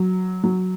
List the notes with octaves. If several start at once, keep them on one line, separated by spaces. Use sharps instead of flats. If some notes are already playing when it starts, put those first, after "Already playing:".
Already playing: F#3
F#3